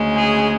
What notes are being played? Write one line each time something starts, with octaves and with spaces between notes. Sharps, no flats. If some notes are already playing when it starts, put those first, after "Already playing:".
Already playing: D2 C#3 G#3
G#4